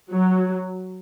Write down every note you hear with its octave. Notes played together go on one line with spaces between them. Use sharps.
F#3